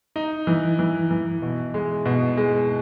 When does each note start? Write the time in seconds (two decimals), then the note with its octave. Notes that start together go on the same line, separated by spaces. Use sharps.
0.16 D#4
0.47 E3
0.79 E3
1.11 E3
1.42 B2
1.74 G#3
2.05 B2
2.37 G#3